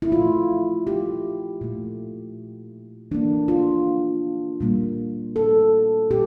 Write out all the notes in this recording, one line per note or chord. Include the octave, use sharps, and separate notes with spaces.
E4
A#2 F3 A3 F4
G4
A#2 A3
E3 A#3 D4
F4
A#2 G3 A#3
A4
A#2 G4